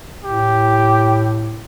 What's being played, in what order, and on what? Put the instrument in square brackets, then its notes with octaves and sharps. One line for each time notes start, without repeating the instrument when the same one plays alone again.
[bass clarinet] A2 [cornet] G4